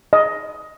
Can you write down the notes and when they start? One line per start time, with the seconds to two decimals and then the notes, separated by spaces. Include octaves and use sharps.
0.13 D#5